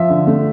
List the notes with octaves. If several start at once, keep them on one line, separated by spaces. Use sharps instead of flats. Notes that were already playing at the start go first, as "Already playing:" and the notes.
Already playing: F3 E5
D3
A3